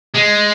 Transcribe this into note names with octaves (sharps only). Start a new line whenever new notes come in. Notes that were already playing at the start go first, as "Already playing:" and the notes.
G#3